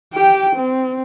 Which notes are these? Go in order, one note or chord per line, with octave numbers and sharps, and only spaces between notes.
G4 G5
C4